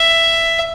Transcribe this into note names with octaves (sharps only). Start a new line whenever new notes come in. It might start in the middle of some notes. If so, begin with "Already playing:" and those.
Already playing: E5